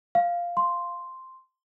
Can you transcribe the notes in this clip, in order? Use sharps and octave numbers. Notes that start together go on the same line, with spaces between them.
F5
C6